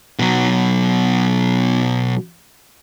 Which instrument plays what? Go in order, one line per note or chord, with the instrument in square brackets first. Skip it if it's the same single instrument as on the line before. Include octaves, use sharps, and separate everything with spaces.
[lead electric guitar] B2 F#3